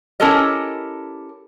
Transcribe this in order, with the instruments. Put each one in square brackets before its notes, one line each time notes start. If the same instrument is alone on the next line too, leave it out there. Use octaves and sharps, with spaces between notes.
[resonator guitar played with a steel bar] C#4 E4 G4 A4 A#4 D#5